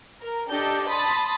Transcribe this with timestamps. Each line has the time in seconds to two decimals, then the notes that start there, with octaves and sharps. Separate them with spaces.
0.22 A#4
0.50 D4 G4 A4 D5 D#5 G6
0.88 A5 B5 C6 D#6 A6